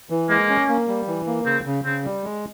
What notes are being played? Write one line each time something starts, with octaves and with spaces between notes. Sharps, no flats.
E3
G#3 A#3
C#4
A#3
G3
E3
A#3
C#3 C4
C#3
C#3 C4
G3
G#3